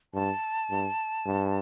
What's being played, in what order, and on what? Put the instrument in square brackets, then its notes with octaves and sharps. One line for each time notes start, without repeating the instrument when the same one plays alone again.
[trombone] G2 [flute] A5
[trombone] G2
G2